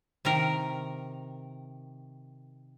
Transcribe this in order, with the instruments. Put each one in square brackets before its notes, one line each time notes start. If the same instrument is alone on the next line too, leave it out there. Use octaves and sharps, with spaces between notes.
[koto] C3 D#3 A#4